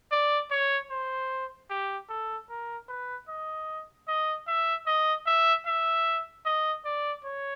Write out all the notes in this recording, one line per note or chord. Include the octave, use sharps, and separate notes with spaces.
D5
C#5
C5
G4
A4
A#4
B4
D#5
D#5
E5
D#5
E5
E5
D#5
D5
C#5